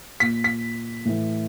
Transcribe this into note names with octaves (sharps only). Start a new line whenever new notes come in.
A#2 B6
B6
A2 E3